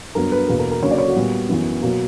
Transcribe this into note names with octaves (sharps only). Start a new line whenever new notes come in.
G2 F#3 B3 A#4
B4
E2 B2 A#3 B4
A#4
A#4
D2 C#3 F#3 A#3 C#5
D5
C#5
F#4
A#2 G3 B3
F#2 E3 B3
B2 F#3 A#3